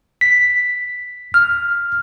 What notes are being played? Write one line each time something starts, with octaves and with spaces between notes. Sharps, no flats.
B6
F6